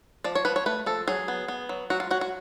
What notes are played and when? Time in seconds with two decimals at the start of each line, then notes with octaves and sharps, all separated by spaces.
0.24 F3 D5
0.35 C#5
0.45 F3 B4
0.56 C#5
0.66 A3 B4
0.86 F3 A4
1.08 F#3 G#4
1.28 B3
1.48 B3
1.69 F#3
1.90 F#3 F#4
2.00 F4
2.11 F#3 F#4
2.21 F#4